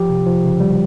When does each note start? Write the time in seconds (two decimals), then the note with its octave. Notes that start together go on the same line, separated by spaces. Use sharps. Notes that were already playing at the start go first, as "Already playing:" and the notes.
Already playing: F3 G4
0.10 C3
0.26 F3
0.44 C#3
0.60 G3